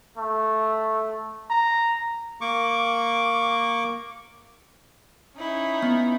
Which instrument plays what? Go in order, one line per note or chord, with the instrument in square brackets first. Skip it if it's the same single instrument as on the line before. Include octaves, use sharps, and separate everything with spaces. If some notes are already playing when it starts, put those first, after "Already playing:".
[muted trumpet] A3
A#5
[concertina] A#3 C#6 D6
[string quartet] C#4 D#4 E4
[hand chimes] B3